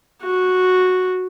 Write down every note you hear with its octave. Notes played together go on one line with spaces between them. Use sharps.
F#4